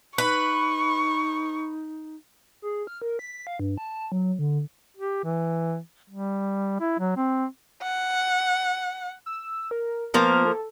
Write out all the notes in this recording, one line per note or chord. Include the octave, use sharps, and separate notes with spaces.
D#4 B4 C#6
G#4
F6
A#4
B6
F5
G2
A5
F#3
D3
G4
E3
G3
E4
F#3
C4
F#5
E6
A#4
F3 A#3 B3 A#4
A4